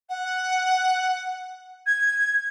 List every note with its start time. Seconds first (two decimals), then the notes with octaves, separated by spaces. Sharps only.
0.09 F#5
1.86 G#6